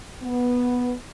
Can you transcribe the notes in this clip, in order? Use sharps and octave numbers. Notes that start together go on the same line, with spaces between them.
B3